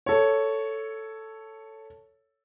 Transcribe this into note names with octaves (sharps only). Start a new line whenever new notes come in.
A4 C#5